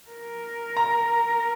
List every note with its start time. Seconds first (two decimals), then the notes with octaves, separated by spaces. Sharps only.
0.11 A#4
0.77 A#5